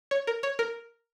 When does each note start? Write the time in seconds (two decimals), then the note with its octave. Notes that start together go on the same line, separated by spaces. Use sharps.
0.11 C#5
0.27 A#4
0.43 C#5
0.59 A#4